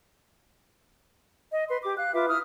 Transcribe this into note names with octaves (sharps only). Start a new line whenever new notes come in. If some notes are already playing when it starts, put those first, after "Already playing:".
D#5
B4 C6
G4 D6
F5 F#6
F4 B4 E5 D6
E4 D#6 F6